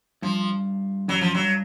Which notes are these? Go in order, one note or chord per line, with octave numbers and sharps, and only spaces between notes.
G2 F3
F#2 F#3
F3
G2 F#3